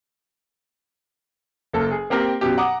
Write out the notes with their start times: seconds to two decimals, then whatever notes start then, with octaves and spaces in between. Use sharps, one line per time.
1.73 F#1 A#3 A4
1.91 G#4
2.10 A#3 C4 G4 A#4 G5
2.41 F#2 B2 G4
2.57 F#5 A#5 D6 D#6